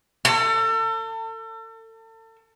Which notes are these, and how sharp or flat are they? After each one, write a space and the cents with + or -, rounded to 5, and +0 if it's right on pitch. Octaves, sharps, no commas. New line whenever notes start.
A4 +35